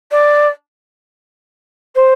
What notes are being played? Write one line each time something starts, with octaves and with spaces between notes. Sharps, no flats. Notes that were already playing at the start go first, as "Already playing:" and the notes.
D5
C5